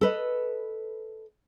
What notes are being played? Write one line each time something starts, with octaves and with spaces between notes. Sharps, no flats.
A4 B4 D#5